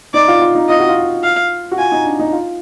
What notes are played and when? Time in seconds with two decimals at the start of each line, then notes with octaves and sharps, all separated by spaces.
0.14 D#4 D5
0.28 F4
0.41 F4
0.55 D#4
0.69 F4 D#5
0.79 F#4
0.89 F4
1.24 F5
1.72 F#4
1.78 F4 G#5
1.92 D#4
2.05 D4
2.19 D#4
2.33 F4